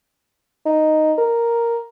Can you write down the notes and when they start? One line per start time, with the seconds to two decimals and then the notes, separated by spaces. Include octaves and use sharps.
0.66 D#4
1.18 A#4